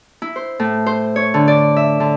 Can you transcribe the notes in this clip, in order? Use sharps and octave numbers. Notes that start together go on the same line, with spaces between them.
E4
C5
A2
C5
C#5
D3
D5
E5
D3